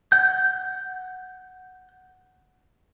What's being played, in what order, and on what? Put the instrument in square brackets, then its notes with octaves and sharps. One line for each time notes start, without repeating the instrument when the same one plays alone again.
[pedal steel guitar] F#5 G6